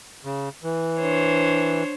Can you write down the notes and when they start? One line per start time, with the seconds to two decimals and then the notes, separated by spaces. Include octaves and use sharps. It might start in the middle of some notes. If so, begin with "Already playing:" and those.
0.25 C#3
0.64 E3
1.00 D4 C5 C#5